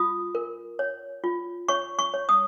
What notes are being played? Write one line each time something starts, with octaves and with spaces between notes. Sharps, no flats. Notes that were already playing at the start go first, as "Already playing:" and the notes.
Already playing: F4 D#6
A#4
C#5
F4
C#5 C#6
C#6
C#5
D#6